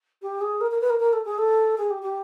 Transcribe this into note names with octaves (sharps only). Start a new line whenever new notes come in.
G4
G#4
A#4
A#4
B4
A#4
A#4
A4
G#4
A4
G#4
G4
G4